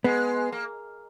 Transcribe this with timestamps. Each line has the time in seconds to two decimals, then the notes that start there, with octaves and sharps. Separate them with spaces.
0.04 G#3 B3
0.52 A#3